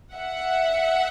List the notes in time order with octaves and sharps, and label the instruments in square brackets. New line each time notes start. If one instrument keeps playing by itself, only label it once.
[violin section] E5 F#5